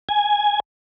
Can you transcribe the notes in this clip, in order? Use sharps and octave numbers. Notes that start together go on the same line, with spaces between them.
G#5